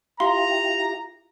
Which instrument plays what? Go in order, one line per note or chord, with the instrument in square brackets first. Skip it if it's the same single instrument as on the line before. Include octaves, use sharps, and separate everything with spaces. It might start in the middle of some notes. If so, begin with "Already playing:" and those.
[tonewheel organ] E4 F4 G4 [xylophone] F5 C6 [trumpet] A#5